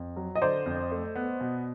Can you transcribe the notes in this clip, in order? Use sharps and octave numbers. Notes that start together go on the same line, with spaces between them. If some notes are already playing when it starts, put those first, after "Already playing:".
Already playing: F2
F#3
D#5
D3 C5 D5
F2
A3
B3
B2